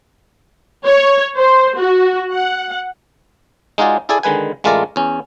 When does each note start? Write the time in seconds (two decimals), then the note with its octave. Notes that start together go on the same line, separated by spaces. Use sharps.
0.85 C#5
1.36 C5
1.78 F#4
2.31 F#5
3.78 G#3 D#4 F4 F#4 G#4 D5
4.09 E4 G#4 A4 D5 G#5
4.23 D3 D#3 G#3 B4 G#5
4.64 A1 G#3 A3 F4 A#4 D5
4.96 E2 C#4